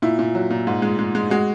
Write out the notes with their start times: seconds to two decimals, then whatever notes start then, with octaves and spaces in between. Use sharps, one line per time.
0.02 A#2 E4
0.19 A#2
0.35 F#3
0.50 A#2
0.67 G#2
0.82 G#3
0.99 G#3
1.15 G#3
1.30 G#3 F#4